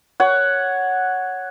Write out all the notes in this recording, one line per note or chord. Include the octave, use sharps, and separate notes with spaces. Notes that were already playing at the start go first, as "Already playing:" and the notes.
C#5 F#5